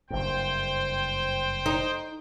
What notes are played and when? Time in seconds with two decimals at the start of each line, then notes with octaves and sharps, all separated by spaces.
0.10 F#1 G2 C5 G5
1.66 D#4